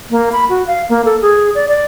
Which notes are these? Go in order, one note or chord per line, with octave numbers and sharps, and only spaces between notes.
A#3
B5
F#4
F5
A#3
A4
G#4
D5
D5